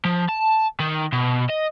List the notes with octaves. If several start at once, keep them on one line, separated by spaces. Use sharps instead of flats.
F3
A5
D#3
B2
D#5